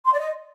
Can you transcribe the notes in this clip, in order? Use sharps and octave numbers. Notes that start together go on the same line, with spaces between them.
C6
D5
D#5